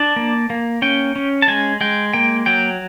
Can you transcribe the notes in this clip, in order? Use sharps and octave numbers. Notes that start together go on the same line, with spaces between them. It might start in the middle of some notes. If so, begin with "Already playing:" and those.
Already playing: D4 A5
A#3
A#3
C#4 G5
C#4
A5
G#3 G#5
G#3 G5
A#3 G5
F#3 G5